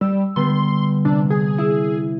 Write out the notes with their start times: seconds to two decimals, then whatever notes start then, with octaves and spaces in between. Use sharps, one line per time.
0.01 G3 E6
0.36 D3 G3 B3 C6
1.05 C3 D4
1.30 G#4 G#5
1.58 E4